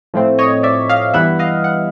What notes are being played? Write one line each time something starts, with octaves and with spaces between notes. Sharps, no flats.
A2 F3 A3 C4
C#5 D#5
D5 E5
D#5 F5
G2 E3 G3 B3 E4 E5 F#5
D#5 F5
F#5